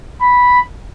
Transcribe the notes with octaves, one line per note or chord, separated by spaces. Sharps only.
B5